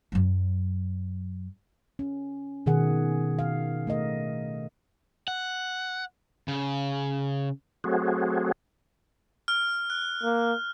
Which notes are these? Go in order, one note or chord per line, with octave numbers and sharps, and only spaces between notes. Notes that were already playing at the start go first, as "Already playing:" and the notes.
F#2 F#3
C#4
B2 D#3 G#4 F#5
F5
A3 A#4 D#5
F#5
C#3
F#3 A3 C4 F#4 G#4
F6
F#6
A#3